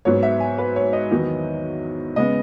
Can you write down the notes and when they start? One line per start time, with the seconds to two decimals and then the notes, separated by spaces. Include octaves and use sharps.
0.05 G#2 F#3 B3 C#5
0.23 E5
0.40 G#5
0.58 B4
0.76 C#5
0.93 D#5
1.11 E2 D#3 F#3 B3
2.16 C#3 G#3 B3 D#5